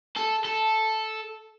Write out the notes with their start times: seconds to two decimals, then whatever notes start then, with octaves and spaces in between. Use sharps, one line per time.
0.17 A4
0.45 A4